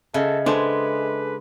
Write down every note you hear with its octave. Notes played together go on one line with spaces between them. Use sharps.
C#3 A4 D#5 E5
G#3 D4 A4 B4 C5